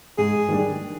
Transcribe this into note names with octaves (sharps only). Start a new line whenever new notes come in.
G#2 G#4
D#3 G3 D4